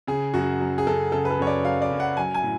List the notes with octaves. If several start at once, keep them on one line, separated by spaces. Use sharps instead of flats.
C#3 G#4
F#2 F#4
F#3
G#4
F#2 A4
C#3 A4
B4
A4
F#2 C#5
D5
F#3 F5
D5
F#2
F#5
F#3 G#5
G#5
A2